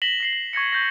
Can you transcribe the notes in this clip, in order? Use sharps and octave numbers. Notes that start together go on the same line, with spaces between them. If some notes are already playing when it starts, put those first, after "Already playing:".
A#6 B6 E7 F#7 G7
A#6 C7 F#7
F#7
C#6 G#6 A#6 C#7
C#6 G6 A#6